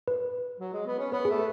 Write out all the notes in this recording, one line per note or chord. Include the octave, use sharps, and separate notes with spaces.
B4
F#3
G#3
B3
C#4
B3 B4
G#4
A3